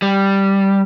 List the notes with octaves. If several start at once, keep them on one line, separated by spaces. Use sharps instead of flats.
G3